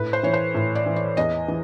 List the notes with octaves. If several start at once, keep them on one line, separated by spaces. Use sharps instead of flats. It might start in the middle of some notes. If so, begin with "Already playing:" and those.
Already playing: A2 B4
C5
E3 C#5
C5
A2
D5
E3
D5
E2 D#5
E3